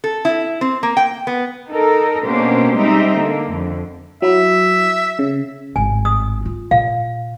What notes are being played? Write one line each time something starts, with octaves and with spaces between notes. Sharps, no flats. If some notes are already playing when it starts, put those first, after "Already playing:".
A4
E4
C4
A#3
G5
B3
D#4 A4 A#4
B2 A#3 C#4 D4 G4 C5
G3 G#3 C4 D#4 E5
D3 A#3
F2 D3
F#3 E4 E5
C#3
G#1 A2 G#5
D#6
F4
A#2 F5